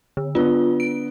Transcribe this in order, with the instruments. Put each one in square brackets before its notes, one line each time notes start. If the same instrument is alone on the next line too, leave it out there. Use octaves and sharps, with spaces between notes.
[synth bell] D3
[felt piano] D3 B3 [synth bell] F4
[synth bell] D7